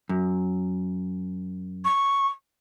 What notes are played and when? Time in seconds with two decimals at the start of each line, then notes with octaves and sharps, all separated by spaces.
0.09 F#2
1.85 C#6